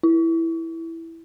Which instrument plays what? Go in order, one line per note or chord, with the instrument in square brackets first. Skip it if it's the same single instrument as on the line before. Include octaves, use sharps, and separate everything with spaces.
[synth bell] E4